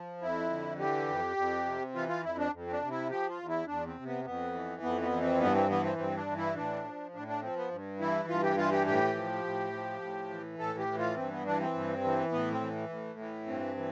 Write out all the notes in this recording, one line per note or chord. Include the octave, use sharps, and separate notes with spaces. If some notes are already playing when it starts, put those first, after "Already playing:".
Already playing: F3
F2 E4
D3
E3 G4
F2
F2
C3
E3 F4
F4
F2 E4
D4
F2
C4
D4
C3
E4
F3 G4
F4
E2
E4
E2 D4
C4
C3
B3
F2 B3
E3
F2 B3
B3
E3
C4
G2 B3
C4
E3 B3
C4
G2 C4
D4
E3
E4
A2 D4
F3
A2 D4
D4
F3 C4
B3
G2
E3 E4
G2 F4
G4
E3 F4
G4
A2 G4
F3
A2
F3
A2
E3
A2 A4
G4
E3
F4
G2 C4
B3
E3 D4
C4
G2
E3
A2 B3
C4
E3
A2
E3
G2 C4
E3